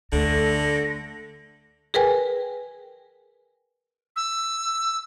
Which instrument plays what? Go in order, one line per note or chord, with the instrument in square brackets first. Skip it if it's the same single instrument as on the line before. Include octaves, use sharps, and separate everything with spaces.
[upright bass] D2 [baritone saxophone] D3 [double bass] A3 [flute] A#6
[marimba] G#4 A#4 B4 G5 G#5
[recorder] E6